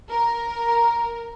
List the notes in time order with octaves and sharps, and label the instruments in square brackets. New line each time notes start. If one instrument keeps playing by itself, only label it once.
[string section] A#4